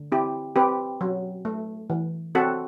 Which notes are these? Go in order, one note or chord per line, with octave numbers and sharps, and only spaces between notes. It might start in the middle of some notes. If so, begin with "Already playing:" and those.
Already playing: D3
C4 E4 G4
C4 G4 B4
F#3
A3
E3
C4 F#4 A4